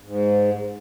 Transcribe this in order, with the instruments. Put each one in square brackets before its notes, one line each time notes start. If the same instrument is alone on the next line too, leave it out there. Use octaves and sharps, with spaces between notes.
[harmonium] G#2